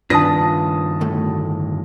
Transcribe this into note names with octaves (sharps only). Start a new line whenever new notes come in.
G2 D#3 D4 F4 B4 A5 D#6 A#6
D2 A2 A3